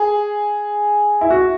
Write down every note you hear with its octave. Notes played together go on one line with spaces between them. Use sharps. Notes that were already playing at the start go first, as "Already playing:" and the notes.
Already playing: G#4
E4
F#4